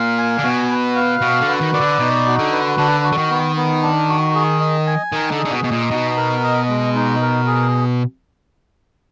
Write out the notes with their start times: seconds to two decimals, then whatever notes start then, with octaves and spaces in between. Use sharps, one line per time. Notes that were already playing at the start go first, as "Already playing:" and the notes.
Already playing: A#2 F5
0.18 G#5
0.38 D3
0.43 B2 F#4
0.70 B4
0.96 F5
1.21 B2 F#4
1.41 D3
1.48 B4
1.61 D#3
1.74 D#3 D5
1.81 D3
2.00 B2 D#4
2.26 F#4
2.39 D3
2.52 B4
2.78 D3 D4
3.04 F#4
3.12 D3
3.17 D#3
3.30 B3
3.56 B3
3.82 D4
4.08 F#4
4.34 G#4
4.60 D#5
4.87 G#5
5.12 D#3 D#4
5.32 D3
5.39 G#4
5.45 D3
5.51 B2
5.64 B2 D#5
5.71 A#2
5.91 B2 D#4
6.17 A#4
6.43 D#5
6.69 G#3
6.95 D#4
7.21 A#4
7.47 G#4